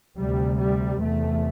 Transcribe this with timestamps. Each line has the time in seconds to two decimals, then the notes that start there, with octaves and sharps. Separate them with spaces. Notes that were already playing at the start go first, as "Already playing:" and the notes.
0.17 D2 C3 G3
0.58 G3
1.00 E2 C3 A3